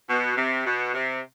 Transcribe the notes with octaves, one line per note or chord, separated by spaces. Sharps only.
B2
C3
B2
C3